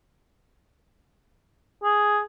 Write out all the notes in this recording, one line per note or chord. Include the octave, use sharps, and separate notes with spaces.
G#4